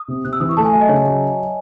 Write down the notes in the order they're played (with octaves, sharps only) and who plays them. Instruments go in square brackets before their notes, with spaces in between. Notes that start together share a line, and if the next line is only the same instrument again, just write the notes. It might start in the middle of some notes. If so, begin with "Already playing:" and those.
Already playing: [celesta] D#6
[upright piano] C3
[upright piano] C3 [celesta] F#6
[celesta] E6
[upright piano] E3 [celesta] D#6
[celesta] C#6
[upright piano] A3 [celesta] A5
[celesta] G#5
[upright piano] F#3 [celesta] E5
[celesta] D#5
[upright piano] C#3 [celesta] C#5
[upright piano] F#3